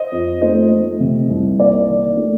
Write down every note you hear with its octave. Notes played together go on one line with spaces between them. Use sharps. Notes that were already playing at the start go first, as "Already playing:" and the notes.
Already playing: C5 D#5
F2
A3 C5 D#5
A3
C3
C2
A#3 D5
D#3
A3